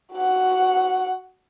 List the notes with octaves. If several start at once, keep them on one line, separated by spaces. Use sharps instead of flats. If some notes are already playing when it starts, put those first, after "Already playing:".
F#4 F#5